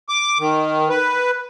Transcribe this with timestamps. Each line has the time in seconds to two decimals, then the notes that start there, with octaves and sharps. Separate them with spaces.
0.09 D6
0.40 D#3
0.89 B4